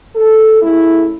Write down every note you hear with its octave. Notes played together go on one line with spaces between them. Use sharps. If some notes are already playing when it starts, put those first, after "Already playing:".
A4
C#3 A3 E4